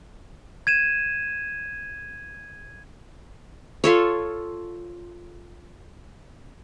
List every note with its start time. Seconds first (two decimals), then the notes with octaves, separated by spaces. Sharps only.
0.67 G#6 D#7 E7
3.84 F4 A4 C#5